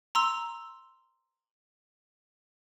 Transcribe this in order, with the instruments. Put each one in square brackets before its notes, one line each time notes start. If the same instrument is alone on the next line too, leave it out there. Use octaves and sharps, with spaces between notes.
[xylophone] A#5 C6 E6